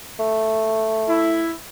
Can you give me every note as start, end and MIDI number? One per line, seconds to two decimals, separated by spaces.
0.19 1.52 57
1.07 1.50 64